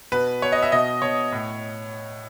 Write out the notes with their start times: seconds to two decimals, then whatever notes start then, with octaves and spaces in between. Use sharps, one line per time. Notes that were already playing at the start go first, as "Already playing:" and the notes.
0.12 B2 B4
0.42 B2 C#5
0.52 D#5
0.62 E5
0.72 B2 D#5
1.02 B2 C#5
1.32 A2